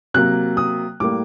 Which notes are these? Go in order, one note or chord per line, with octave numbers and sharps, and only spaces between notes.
C3 F#3 A#3 F#6
D#6
A2 G3 A#3 D6